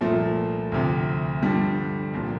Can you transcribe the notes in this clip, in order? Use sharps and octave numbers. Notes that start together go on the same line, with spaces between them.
C2 A#2 F3 A3
D2 C3 F3
G2 D3 F3 G3
C2 A#2 F3